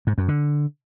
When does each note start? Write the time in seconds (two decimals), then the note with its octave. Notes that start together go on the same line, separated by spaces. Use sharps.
0.07 G#2
0.18 F#2
0.28 D3